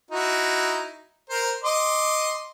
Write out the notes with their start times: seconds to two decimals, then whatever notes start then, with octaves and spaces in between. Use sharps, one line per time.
0.11 D#4 E4 F#4
1.30 A#4 C5
1.64 D#5 C6 D6